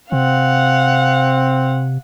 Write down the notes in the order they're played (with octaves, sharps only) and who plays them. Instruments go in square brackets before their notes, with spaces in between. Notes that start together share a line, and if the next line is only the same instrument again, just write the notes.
[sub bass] C3 [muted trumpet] C4 [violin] F5 F#5